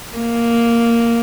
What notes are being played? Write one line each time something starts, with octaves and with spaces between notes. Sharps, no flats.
A#3